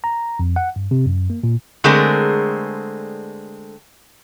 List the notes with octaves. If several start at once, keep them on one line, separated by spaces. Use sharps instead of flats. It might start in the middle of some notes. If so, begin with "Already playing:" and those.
A#5
F2
F#5
G2
C3
F#2
A#3
A#2
D3 G#3 A3 C4 G#4 A#4